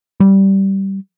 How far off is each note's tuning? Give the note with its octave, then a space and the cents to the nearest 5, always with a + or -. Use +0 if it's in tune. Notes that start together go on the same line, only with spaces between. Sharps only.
G3 -15